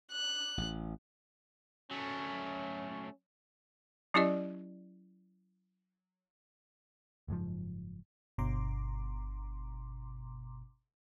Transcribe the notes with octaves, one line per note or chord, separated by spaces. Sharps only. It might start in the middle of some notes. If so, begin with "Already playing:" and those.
F#6
A1
F#3 A3 C#4
F#3 C#4 E4 G4 D5 D#5
F#1 G#2 B2 F3
G1 B2 A#5 C6 D6